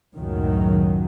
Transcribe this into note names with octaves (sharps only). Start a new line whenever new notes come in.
C#2 F#2 A2 D#3 F#3